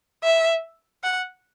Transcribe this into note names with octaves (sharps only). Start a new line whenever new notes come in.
E5
F#5